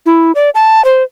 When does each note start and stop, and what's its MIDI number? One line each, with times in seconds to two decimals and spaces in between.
0.06 0.32 64
0.35 0.50 74
0.55 0.84 81
0.85 1.03 72